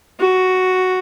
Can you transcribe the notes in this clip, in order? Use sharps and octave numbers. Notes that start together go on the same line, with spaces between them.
F#4